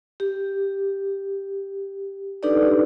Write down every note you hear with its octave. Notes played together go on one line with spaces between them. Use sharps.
G4
D4 D#4 G4 A4 B4 D5